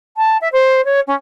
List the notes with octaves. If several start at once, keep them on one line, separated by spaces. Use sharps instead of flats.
A5
E5
C5
C#5
C#4